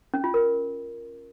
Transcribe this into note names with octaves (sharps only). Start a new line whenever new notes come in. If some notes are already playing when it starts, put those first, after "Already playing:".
C#4
F4
A#4